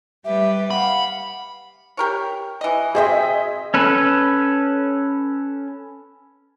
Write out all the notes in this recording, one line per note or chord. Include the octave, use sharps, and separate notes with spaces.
G3 G4 B4 E5
F5 F#5 B5
G4 A#4 C#5
E3 D#5
C4 G#4 C5 D#5 E5 G5
C#4 A4 B4